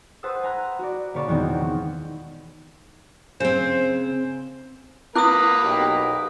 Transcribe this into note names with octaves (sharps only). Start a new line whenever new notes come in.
B4 C5 F#5 A5 D#6 E6
G#5 A#5 B5 F#6 G#6
F#4 D5
A#2 C#3 B4 C#5 D5 A5
E2 B2 D#3 G#3 B3 C4
C#3 C4 C5
A#3 E4 B4 D6 D#6 F#6
B1 G4